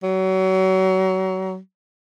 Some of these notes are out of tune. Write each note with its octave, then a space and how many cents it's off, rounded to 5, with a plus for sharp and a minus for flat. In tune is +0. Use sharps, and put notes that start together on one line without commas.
F#3 +30